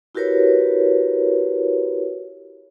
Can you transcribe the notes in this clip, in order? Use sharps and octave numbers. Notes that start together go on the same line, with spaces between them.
E4 F#4 G4 A#4 B4 C#5